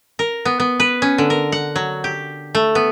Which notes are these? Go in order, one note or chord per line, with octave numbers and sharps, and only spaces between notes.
A#4
B3
B3
B4
C#4
D3
A#4
F#5
F#3
G4
A3
B3